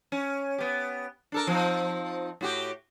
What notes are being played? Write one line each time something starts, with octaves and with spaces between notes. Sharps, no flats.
C#4
B3 G4
D4 A4 A#4
F3 C4 D#4
A2 F#4 G4